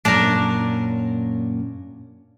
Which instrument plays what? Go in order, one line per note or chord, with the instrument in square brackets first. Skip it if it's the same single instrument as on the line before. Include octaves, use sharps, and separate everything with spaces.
[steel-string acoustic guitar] F#2 A#2 C#4 [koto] D4 A#4